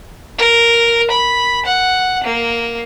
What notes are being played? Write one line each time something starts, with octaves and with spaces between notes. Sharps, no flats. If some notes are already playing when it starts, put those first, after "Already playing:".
A#4
B5
F#5
A#3